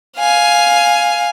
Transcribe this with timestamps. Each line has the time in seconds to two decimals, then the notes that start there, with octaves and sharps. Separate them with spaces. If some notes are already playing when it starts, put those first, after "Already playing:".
0.18 F5 G#5